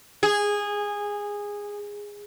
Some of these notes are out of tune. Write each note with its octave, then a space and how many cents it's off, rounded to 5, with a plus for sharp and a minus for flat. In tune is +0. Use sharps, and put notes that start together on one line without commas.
G#4 -15